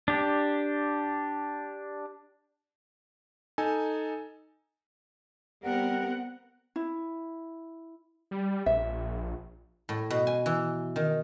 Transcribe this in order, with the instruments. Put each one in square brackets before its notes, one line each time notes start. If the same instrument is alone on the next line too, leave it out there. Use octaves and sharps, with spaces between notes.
[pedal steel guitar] D4 G4
[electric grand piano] D#4 A4 G#5
[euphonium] G3 [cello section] B3 C4 A#4 [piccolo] F#5
[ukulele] E4
[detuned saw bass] G3
[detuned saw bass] A#1 [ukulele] E5
[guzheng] A2
B2
G#5
E3
D#3